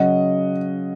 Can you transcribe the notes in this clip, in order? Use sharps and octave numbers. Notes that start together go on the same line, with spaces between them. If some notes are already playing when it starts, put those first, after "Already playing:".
Already playing: C#3 F#3 D#5 F#5